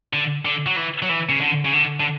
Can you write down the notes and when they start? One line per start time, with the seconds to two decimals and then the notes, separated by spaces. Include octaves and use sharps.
0.13 D3
0.45 D3
0.67 F#3
0.77 E3
1.02 F#3
1.09 E3
1.29 C#3
1.41 D3
1.65 C#3
1.73 D3
2.00 D3